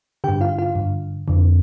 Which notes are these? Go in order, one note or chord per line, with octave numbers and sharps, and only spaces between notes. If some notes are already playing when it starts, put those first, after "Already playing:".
G2 D3 G4 G5
F4 F5
F4 F5
G2 D3
F2 D3